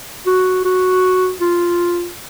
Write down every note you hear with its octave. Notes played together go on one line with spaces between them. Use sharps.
F#4
F#4
F4